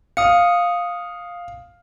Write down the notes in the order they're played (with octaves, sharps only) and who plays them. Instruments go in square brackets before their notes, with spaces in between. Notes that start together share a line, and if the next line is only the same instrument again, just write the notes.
[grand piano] F5 [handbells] D#6 C#7